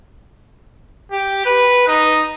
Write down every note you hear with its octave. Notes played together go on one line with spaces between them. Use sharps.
G4
B4
D#4